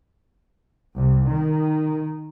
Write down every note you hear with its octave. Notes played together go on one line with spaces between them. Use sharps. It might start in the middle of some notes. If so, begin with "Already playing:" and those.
C2
D#3